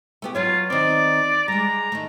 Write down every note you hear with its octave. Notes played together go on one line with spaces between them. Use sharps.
A3 B3 G4
F#3 F4 B4 C#5
D#3 C4 D5
G3 G#3 A#5
D#3 A3